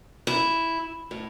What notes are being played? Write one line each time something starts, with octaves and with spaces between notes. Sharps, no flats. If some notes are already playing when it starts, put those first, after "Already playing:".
E4
A2